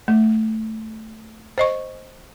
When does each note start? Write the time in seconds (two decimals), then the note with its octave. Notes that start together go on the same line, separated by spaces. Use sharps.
0.08 A3
1.58 C5 D#5 C#6